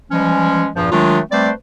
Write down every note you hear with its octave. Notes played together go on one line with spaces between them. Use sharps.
E3 F3 G3 G#3 C#4
E2 G2 A#2 F3
D#3 F#3 G#3 A3 D4 F4
G3 A3 C4 B4 C5 D5